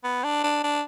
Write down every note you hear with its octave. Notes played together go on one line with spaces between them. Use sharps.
B3
D4
D4
D4